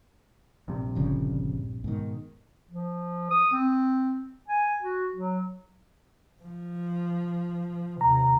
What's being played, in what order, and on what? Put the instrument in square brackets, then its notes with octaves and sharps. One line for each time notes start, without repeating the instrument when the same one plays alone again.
[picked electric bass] A#1 G2 C3
[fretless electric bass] G1 C#3 F3
G#2 B2 D#3
[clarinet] F3
D#6
C4
G#5
F#4
F#3
[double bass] F3
[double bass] D#2 C3 [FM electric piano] A#5